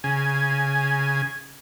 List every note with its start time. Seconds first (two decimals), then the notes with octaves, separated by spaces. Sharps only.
0.04 C#3 G#5